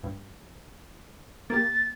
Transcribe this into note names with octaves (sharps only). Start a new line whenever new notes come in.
G2
A#3 G4 A6